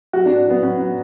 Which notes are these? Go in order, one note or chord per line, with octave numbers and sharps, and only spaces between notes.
F#3 F#4
A2 D4
F#3 B3
F#3 C#4
F#3